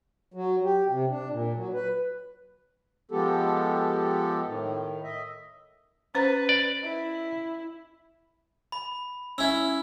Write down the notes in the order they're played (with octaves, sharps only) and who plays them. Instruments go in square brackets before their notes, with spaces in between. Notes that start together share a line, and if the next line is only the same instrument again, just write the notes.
[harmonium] F#3
G4
C3
D4
A#2
F#3
B4
F3 G#3 B3 G4 A4
A2 D#3
D#5 E5
[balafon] C#4 C5 A#5 [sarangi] B4
[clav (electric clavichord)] D5
[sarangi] E4
[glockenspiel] B5
[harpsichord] C#4 E4 [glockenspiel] E6